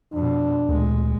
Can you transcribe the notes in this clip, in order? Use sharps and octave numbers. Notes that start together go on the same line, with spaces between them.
F2 B2 D4
D2 A#2 G#3